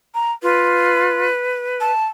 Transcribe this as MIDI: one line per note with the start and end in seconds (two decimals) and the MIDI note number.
0.15 0.32 82
0.43 1.28 65
0.43 1.92 71
1.81 2.07 81